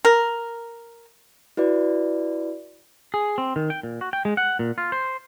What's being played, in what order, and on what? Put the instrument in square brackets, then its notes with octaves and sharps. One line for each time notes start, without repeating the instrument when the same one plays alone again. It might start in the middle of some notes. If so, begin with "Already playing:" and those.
[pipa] A#4
[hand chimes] E4 F#4 B4 D5
[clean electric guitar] G#4
C4
D#3
G5
A#2
F#4
G5
G#3
F#5
A#2
F4
C5